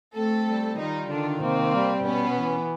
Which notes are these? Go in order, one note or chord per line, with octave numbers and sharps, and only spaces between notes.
A3 C4 A4
G3
D#3 D#4 F4
D3 D#3 D4
C3 A#3 C4
G3
B2 B3 C#4
E3